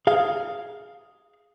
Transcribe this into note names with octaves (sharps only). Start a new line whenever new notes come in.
G#4 F5